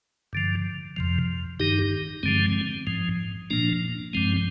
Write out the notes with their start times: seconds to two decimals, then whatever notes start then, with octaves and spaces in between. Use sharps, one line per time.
0.33 G2 D3 F3
0.96 F2 C3 F3
1.60 G2 D#3 D#4 G4
2.23 G2 D3 F3 G#3 C4
2.87 G#2 F3
3.50 A#2 F3 A#3 D4
4.13 G2 F3 G#3 C4